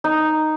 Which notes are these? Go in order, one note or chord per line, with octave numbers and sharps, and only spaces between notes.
D#4